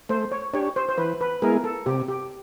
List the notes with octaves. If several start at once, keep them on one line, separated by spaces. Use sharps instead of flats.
A3 C5
C#5
D4 G4 C#5
C5
C5
E3 B4
B4
G#3 B3 E4 G#4 A#4
A4
C3 G4
G4